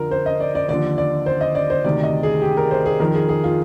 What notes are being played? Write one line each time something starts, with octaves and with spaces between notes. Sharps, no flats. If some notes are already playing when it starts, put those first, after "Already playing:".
Already playing: F2 D3 F3 A#4
C5
D#5
D5
D5
D#2 D3 F3 D5
D5
C5
D#5
D5
C5
D2 C3 D#3 D5
D#5
G#4
G4
A#4
C5
G#4
F2 D#3 A#4
G#4
G#4
F4